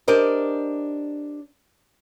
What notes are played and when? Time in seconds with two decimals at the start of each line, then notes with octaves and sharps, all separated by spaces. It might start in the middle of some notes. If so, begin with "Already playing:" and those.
0.08 D4 G4 A#4 C5 D#5